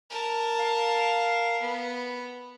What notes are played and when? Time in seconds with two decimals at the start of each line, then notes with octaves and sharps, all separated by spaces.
0.10 A#4 A5
0.59 F5
1.61 B3